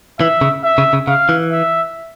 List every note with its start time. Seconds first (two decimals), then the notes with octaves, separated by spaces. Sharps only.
0.20 E3 E5
0.41 C#3
0.64 E5
0.78 C#3
0.93 C#3
1.08 C#3 F5
1.29 E3
1.52 E5